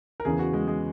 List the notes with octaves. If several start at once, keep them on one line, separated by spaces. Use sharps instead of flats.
A#4
E2 C#3 E3 G#4
F#4
G#3
G#3